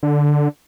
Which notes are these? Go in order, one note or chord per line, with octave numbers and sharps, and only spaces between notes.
D3